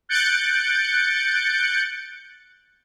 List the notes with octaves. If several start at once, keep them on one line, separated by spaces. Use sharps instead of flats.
F#6 G6 A6 C#7 D7